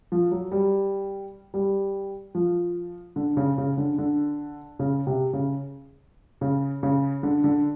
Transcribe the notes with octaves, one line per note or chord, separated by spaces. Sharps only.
F3
F#3
G3
G3
F3
D3
C#3
C#3
D3
D3
C#3
C3
C#3
C#3
C#3
D3
D3